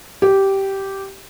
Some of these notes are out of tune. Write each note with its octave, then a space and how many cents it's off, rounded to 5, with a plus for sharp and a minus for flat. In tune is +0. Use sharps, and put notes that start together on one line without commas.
G4 -10